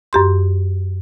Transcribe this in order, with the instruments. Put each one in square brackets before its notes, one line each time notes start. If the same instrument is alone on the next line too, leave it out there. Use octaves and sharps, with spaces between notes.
[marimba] F#2 G4 C6